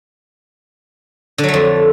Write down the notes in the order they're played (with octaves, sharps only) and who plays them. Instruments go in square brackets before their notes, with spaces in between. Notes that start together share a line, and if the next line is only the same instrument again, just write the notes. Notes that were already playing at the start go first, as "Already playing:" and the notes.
[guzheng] D3
F#3
A3
F2